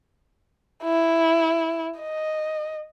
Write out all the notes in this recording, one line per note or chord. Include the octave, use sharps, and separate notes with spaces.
E4
D#5